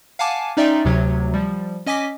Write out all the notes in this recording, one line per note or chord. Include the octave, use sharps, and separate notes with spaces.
F5 F#5 G#5 A5 D6
C#4 D#4 D5 E5 G5 C6
D2 C3 F#3 G#6
F3 G3
C#4 D#5 G#5 D6 B6